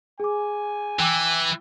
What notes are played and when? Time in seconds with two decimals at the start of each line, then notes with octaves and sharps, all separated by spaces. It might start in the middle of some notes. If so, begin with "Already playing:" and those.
0.20 G#4 G#5 D6
0.99 E3 G5 D6 E6